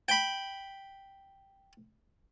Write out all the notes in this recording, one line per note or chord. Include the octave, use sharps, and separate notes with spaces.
G5 B5